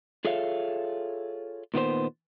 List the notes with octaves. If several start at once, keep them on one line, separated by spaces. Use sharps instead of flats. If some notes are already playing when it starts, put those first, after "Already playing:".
F4 G#4 A4 C#5 E5 F5
A#2 D#3 B3 C5